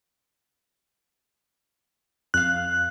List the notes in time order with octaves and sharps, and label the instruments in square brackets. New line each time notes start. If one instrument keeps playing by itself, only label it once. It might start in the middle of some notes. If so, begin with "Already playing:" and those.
[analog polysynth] F2 F5 [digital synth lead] F#6